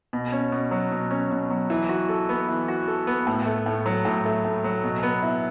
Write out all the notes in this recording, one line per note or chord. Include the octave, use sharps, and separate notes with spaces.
B2
C#4
B2
F#3
B2
C#4
B2
F#3
E3
F#4
A4
B3
E3
F#4
A4
B3
A2
A3
A2
F#3
A2
A3
A2
F#3
B2
B3
E4